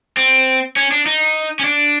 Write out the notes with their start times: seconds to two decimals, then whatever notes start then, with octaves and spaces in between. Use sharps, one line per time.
0.17 C4
0.76 C#4
0.92 D4
1.06 D#4
1.59 C#4
1.65 D4